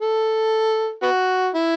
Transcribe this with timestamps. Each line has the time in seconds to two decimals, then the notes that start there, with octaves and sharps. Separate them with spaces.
0.01 A4
1.03 B3 F#4
1.54 E4